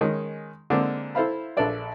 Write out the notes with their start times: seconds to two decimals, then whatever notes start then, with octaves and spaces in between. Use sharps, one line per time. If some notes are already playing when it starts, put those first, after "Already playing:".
0.01 D#3 G#3 C#4
0.70 D3 G#3 A#3 C4 D4
1.15 E4 A4 C5 E5 F5 B5
1.57 A#1 D4 A4 B4 D5 E5